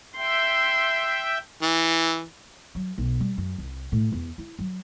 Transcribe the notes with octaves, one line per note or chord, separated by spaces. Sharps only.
E5 G5 C6
E3
F#3
B1
G3
F#2
C2
A2
E2
E4
F#3